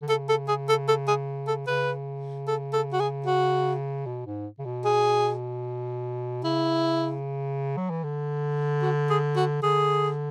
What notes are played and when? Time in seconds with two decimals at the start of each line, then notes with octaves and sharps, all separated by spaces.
0.02 D3
0.08 C#3 A4
0.29 A4
0.48 G#4
0.69 A4
0.88 A4
1.08 G#4
1.47 A4
1.67 C#3 B4
2.47 A4
2.73 A4
2.93 F#4
3.00 G#4
3.26 F#4
4.06 B2
4.26 G#2
4.59 C#3
4.65 B2
4.85 G#4
6.44 C#3 E4
7.77 F#3
7.90 E3
8.04 D3
8.82 F#4
9.10 G#4
9.36 F#4
9.63 D3 G#4